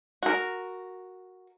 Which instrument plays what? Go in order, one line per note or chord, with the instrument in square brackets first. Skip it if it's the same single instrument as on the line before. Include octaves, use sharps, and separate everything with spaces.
[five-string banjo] F#4 A#4